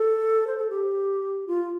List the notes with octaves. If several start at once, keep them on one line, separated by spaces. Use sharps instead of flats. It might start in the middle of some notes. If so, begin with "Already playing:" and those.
Already playing: A4
C5
A4
G4
F4